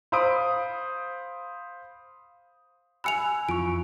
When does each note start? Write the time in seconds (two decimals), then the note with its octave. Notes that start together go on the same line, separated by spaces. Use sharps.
0.12 C5 F5 B5 D#6 D7
3.04 G#5 B5 E6 F#6 C#7 F7
3.49 F2 E3 F4 C#6 D7